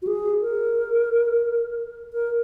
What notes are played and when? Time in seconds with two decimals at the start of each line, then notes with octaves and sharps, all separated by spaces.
0.02 F#4
0.07 G#4
0.41 A#4
2.13 A#4